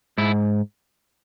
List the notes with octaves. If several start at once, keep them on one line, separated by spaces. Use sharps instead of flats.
G#2 E4